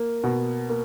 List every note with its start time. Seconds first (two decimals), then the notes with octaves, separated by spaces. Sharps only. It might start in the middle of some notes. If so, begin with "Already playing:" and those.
Already playing: A#3
0.24 B2
0.69 A#3